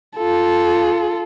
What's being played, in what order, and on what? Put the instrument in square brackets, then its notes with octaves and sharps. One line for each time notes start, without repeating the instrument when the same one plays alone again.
[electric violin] F4 A4